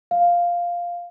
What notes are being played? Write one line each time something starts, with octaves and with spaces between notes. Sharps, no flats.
F5